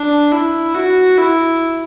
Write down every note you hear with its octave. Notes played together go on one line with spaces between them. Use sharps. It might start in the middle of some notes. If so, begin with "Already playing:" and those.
Already playing: D4
E4
F#4
E4